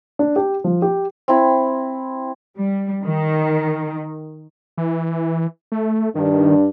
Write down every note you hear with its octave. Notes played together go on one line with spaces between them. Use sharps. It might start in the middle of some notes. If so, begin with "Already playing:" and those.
D4
G4
F3
G4
C4 E4
G3
D#3
E3
A3
G2 D#3 D4